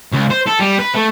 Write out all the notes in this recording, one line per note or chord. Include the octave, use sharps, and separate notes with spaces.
C#2
C5
A4
G3
B4
A3